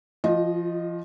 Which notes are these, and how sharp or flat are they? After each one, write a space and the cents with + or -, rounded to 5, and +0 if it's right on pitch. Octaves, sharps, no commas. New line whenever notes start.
F3 -30 F4 +25 D#5 +0